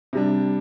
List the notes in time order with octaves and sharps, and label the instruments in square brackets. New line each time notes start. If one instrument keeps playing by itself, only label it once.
[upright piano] C3 G3 D4